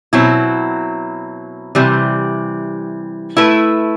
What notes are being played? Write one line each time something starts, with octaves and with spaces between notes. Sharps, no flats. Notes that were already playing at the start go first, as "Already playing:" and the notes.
B2 F#3 C4 E4
C3 E3 G3
A3 E4 B4